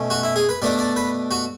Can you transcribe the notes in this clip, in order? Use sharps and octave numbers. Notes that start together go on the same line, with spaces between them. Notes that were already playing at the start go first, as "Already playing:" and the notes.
Already playing: B2 A3 C#4
F#4
E4
G#4
B4
B2 A3 D4 D5
D5
B4
F#4